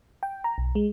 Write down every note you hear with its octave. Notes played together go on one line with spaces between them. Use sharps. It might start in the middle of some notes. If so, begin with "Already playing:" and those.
G5
A#5
B1
G#3